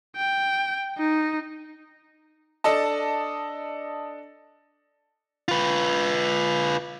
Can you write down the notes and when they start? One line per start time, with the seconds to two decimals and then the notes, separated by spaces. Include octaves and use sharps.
0.16 G5
0.98 D#4
2.64 D4 A4 D#5 A5
5.48 F4 B4